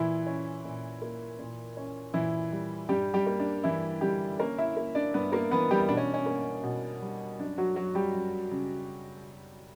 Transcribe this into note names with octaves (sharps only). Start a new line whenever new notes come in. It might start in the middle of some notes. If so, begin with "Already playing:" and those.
Already playing: A#2 E3 E4
C#4
A#2
A#3
A#2
C#4
A#2 E3 E4
G3
G2 G3 G4
G3 G4
A#3
D4
G2 E3 E4
D3 G3 G4
A#3 C#4 A#4
E4 E5
A#3
D4 D5
G2 B3 B4
A#3 A#4
E3 B3 B4
G3 G4
B2 D4
C#4
C#4
A#3
B2
G3
F#2 D4
F#3 F#4
F#3 F#4
G3 G4
F#2
C#3